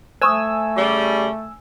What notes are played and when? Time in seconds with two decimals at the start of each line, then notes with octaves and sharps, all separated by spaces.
0.22 A3 C5 G#5 C#6 D#6 E6
0.77 C#3 G3